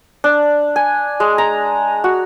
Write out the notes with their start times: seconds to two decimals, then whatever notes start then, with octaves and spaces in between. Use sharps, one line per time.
0.24 D4
0.76 G#5
1.20 G#3
1.38 A#5
2.04 F#4